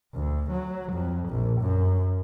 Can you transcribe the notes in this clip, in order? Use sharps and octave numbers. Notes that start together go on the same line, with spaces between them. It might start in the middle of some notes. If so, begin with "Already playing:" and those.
D2
F#3
F2
A#1
F#2